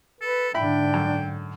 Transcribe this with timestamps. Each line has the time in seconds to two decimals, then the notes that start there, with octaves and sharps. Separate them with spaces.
0.21 A4 B4
0.54 G#2 D3 D4 E4 G5 B5
0.94 F#2